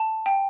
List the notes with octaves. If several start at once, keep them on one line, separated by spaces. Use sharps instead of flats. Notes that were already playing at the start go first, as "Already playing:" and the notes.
Already playing: A5
G5